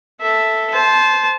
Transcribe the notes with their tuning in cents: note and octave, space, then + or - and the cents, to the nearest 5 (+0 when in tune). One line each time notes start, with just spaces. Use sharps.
A4 +0 E5 +0
C5 +0 A5 -20